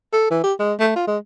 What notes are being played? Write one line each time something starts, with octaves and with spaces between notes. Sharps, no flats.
A4
E3
G4
G#3
A3
F4
G#3